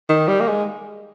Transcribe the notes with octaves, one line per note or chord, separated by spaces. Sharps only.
D#3
G3
A#3
G#3